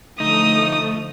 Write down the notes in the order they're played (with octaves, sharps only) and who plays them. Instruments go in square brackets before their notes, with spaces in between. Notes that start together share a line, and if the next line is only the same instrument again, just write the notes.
[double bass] D3 F3 [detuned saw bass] A3 [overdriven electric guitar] D#4 [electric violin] D#6